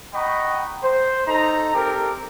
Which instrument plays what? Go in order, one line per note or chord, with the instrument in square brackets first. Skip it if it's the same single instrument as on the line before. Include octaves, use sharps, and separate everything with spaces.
[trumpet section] D#5 F#5 G5 A#5 B5 C#6
C5
D#4 A4 A#5
C4 G4 A4 A#4